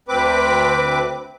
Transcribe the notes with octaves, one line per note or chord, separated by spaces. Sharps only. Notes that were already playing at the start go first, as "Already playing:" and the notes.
D2 C4 B4 D6